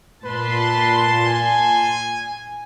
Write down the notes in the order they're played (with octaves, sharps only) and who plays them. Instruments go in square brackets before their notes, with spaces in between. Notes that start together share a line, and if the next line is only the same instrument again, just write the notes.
[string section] A#2 A5 C6 [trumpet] B4
[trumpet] G#5